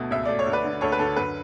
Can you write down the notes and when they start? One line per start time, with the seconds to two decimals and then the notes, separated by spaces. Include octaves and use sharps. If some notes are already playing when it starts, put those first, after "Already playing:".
Already playing: D2 B2 A3
0.11 C#2 E5
0.25 A3 D5
0.39 C#5
0.46 D2
0.52 B4 D5
0.64 D3
0.81 D2 A4 C#5
0.92 B4
0.99 D3 A4
1.16 F#2 B4